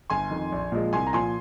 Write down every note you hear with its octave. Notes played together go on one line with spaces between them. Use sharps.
G1 G#5 C6
F2 D#3
A#1
A#2 F3 G#3
C2 G#5 C6
A#5
A#2 F3 G#5 C6